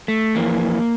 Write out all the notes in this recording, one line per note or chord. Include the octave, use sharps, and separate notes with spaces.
A3
F2 E3 A#3